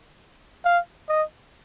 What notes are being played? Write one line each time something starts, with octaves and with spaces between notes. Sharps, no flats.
F5
D#5